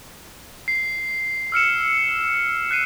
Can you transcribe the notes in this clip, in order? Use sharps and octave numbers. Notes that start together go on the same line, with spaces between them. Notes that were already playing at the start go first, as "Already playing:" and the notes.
C7
E6 F6 C#7 E7
F#6 C7 D#7